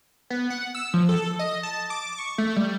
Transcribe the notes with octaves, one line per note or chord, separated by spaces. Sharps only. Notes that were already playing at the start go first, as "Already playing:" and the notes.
B3
F#5
E6
F3
A4
D#5
A5
D6
C#6
A3
G3